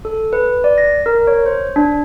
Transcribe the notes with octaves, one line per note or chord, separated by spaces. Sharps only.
A4
B4
D5
A#6
A#4
C#5
C5
D4